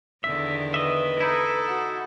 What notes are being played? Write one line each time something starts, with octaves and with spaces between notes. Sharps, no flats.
E2 D3 D#3 E5
B4 D#5 E5
D#4 E4 A4
F#4